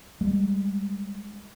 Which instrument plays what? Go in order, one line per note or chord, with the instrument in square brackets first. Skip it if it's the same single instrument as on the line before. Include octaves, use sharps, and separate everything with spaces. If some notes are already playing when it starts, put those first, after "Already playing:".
[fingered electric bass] G3 G#3